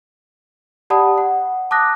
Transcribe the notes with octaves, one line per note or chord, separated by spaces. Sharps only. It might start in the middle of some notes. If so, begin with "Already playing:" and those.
G4 D5 F#5 A5 B5 D#6
F#5
A5 D6 D#6 F#6 A#6